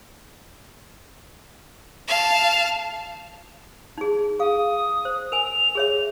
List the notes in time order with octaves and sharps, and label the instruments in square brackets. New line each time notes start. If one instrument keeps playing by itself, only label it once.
[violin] F5 A5
[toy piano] D#4 G#4
[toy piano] G#4 F5 [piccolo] D#6
[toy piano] C5
[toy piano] A#4 G#5 [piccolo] F7
[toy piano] G#4 C#5 E5